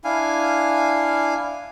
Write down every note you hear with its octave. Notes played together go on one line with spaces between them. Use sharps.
D4 E4 F5 G#5